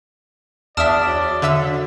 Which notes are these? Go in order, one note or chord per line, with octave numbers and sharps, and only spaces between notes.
E2 D4 D5 E5 A5 D#6 F6
F#3
D3 E5 E6